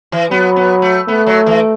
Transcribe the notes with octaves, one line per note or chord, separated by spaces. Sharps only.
E3
F#3 B3
B3
A3
A3 B3
F#3
E3